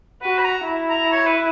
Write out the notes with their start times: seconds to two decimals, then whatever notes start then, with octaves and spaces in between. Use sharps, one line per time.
0.22 F#4 B4
0.39 B5
0.44 A#5
0.67 E4
0.89 A#5
1.12 C#5
1.26 B4